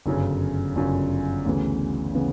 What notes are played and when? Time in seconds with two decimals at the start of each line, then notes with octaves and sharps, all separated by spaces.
0.06 G1 F#2 C#3
0.76 G1 F#2 C#3
1.45 D2 C#3 E3 B3
2.15 C#3 E3 B3